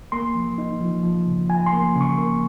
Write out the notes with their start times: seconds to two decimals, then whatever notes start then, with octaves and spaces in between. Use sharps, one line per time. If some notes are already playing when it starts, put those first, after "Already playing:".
0.12 A#3 C6
0.35 F3
0.58 D#4
0.81 F3
1.03 F3
1.26 C#3
1.50 F3 G#5
1.66 C6
1.72 A#3
1.95 C#3
2.01 C#6
2.18 A#3